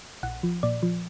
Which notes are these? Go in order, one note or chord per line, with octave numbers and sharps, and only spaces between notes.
A#1 F#5
F3
A#2 D5
F3